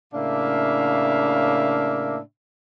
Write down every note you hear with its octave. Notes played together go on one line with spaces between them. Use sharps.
A2 C#3 A#3 D4 E5 F5